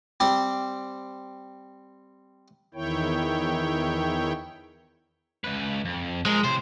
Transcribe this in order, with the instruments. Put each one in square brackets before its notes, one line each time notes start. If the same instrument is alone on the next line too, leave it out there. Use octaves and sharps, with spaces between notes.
[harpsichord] G3 C4 C5 C6
[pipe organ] E2 D#3 E4 C#5 G5
[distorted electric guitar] C#2 B4
F2
[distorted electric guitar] F3 A#4 [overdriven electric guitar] G#3
[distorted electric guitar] A2 C3 [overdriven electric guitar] C5